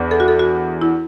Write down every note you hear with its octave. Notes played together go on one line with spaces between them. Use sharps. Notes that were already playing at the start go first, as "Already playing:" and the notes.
Already playing: E2 E3 B3 D4
A4
F#4
A4
F#4
E4